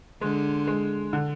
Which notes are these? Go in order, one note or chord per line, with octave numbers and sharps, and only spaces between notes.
D3 G#3
G#3
D3